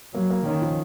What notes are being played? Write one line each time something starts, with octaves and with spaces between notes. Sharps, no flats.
F#3 A#3
A#3
D#3 C#4
F3